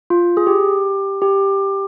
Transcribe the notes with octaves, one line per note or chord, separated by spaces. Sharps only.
F4
G#4
G4
G4